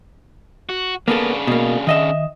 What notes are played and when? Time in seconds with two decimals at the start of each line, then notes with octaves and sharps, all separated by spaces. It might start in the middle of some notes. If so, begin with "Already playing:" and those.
0.69 F#4
1.08 C#3 A#3 B3 D4 A4
1.47 B2 A#3
1.87 D#3 D#5 E5